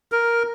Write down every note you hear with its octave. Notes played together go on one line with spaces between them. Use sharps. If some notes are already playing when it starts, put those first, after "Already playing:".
A#4